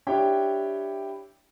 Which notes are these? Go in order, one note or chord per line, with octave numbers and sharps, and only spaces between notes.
D4 E4 G4 C#5 G5